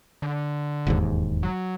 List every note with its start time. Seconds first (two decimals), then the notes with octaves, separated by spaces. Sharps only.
0.22 D3
0.87 E1 D#2 G#2
1.43 F#3